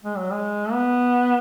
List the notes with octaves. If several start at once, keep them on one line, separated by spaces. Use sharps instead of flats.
G#3
F#3
G#3
B3